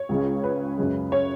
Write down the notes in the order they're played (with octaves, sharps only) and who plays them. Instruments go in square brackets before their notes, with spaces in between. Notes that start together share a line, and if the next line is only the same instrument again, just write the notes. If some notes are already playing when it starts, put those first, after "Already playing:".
Already playing: [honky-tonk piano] C#5
C#2 C#3 G#3
B4
F#2 C#3 G#3
C#5